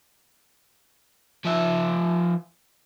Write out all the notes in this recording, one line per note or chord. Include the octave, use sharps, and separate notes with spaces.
F3 E5